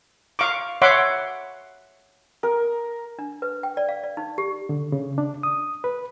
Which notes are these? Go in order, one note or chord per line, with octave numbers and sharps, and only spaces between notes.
F5 C#6 D6
C#5 E5 F#5 B5 C6 D6
A#4
D4
B4
G5
D5
F5
D5
D#4
G4
D3
C#3
D4
D#6
B4